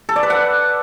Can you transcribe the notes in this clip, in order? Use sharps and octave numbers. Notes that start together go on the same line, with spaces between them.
A4
D5
B4
F#5